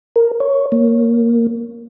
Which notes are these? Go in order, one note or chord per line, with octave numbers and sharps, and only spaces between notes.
A#4
C#5
A#3